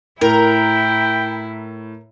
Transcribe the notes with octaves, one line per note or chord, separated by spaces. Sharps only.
A2 E4 A#4 G5